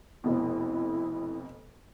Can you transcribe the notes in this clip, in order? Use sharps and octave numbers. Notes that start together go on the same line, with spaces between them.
F1 F2 B2 E4